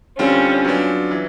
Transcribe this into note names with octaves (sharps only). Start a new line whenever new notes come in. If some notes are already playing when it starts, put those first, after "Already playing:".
D3 G3 C4 C#4 F4
F#3 B3 D4 F4
E3